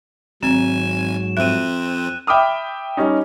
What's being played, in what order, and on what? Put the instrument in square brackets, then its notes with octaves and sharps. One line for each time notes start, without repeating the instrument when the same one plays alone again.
[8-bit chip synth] G#1 G#5 [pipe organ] G#2 F#3 [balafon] C4 [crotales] E7
[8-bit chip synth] F2 C4 [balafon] E5 [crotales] F#6 D#7
[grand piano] E5 G5 B5 D6 D#6 F6
G3 C#4 D#4